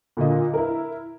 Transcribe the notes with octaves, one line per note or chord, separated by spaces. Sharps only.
A#2 D3 A#3 F4 D#5
E4 A#4